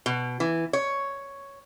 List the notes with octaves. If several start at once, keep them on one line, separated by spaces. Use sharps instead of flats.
B2
E3
C#5